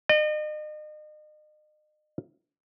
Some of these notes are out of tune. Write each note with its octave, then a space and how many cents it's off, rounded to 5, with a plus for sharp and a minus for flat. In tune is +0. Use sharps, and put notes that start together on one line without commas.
D#5 -40